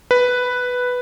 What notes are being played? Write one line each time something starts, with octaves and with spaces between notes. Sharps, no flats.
B4